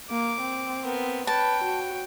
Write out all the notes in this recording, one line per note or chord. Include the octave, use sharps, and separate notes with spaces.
A#3 D6
C4
B3 A#4
B4 C#5 G5 A5
F#4